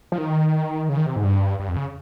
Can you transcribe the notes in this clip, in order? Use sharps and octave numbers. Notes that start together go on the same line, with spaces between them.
F3
D#3
C#3
D#3
C3
G#2
G2
G2
F2
C#3